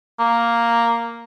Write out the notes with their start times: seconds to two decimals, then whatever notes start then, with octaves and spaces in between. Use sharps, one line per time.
0.19 A#3